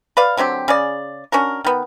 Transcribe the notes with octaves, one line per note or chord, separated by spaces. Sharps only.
B4 D5 F5
D3 F#3 C4 G4
C#3 G#4 D5
C#4 D4 F#4 A#4
D#3 B3